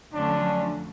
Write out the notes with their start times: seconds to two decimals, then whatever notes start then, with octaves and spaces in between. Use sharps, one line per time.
0.13 F2 D3 F#3 A3 C#4 D4